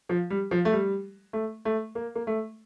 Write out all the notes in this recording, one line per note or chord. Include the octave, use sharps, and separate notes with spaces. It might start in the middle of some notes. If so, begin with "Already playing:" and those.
F3
G3
F3
A3
G3
A3
A3
A#3
A#3
A3